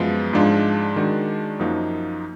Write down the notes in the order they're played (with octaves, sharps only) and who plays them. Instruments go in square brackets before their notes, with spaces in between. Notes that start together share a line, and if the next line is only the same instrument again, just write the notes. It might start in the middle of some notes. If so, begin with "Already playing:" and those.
Already playing: [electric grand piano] F#2 F3 G#3 B3 F4
G#2 F3 G#3 D4 F4
D#3 G#3 D4 F#4
F#2 F3 A#3 D#4 F#4